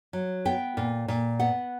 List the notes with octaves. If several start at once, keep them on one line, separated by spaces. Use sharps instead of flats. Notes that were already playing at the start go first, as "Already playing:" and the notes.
F#3
B3 G5
A#2
A#2
B3 F#5